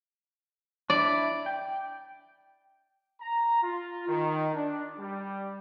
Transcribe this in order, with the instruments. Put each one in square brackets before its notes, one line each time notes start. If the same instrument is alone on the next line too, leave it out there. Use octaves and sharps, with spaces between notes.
[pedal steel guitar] D4 E4 [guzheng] D5
[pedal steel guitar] G5
[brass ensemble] A#5
F4
D#3
D4
G3